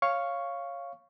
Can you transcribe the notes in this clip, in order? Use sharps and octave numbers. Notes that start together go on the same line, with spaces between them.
C#5 F5 C#6